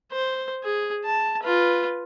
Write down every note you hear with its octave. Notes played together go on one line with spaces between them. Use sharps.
C5
G#4
A5
F4 B4